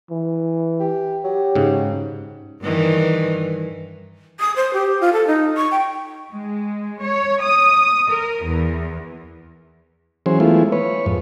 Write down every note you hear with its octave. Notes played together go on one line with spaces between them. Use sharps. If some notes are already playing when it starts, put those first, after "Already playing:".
E3
G4
F#3 G4
G#2 C#3
G2 D#3 E3
D#6
C5
G4
F4
A4
D#4
C#6
G5
G#3
C#5
D#6
A#4
E2
E3 F#3 C#4 G#4 C5
E3 G#3 A3 B3 E4 F4
B4 C#5
F2 G#2